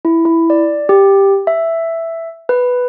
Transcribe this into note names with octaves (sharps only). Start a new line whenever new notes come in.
E4
E4
D5
G4
E5
B4